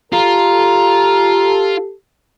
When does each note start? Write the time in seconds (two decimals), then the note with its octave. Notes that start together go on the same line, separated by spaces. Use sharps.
0.12 F4 G4 A4 A#5